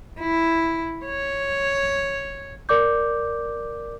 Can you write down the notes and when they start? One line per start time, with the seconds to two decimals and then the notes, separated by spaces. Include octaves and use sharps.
0.20 E4
1.06 C#5
2.69 A#4 D5 D6 G6